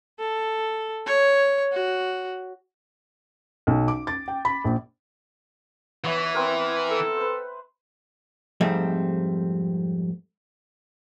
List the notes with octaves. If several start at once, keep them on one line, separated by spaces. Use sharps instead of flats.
A4
C#5
F#4
B1
D6
A6
G5
B5
A#1
E3 B3 C#5 E5
B3 C4 A#4
A4
B4 C5
F2 G#2 G3 A3 C4